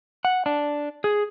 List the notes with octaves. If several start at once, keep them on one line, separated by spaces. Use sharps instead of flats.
F#5
D4
G#4